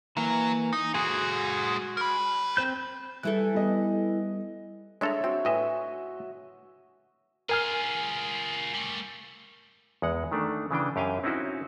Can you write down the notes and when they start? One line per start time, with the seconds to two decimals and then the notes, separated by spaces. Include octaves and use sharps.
0.17 E3 F#3 A#3
0.73 D#4
0.94 G#3 F#4 G#4 F#5
1.97 A#4 B5
2.57 C4 C5 G6
3.23 E3 G3 E4 A4 F#6
3.55 G3 B3 D#5
5.01 G#3 D4 A4 C#5 E5 A#5 C#6
5.24 C4 F#4
5.45 A2 F#4 B4 D#5 E5 G#5
7.49 F4 G#4 A#4 G#5 F6
8.74 G3 A3
10.02 E2 G#3 F#5
10.32 D#3 A3 D4
10.71 C#3 E3 D4 G5
10.96 F#2 G4 F5 G5 G#5
11.23 C4 C#4 D#4 E4 F#4 C5